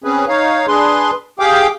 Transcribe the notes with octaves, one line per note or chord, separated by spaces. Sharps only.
C4 C#4 G#4 B4
D#4 C#5 F5
D4 G#4 B4 C6
G4 G#4 F5 G5 D6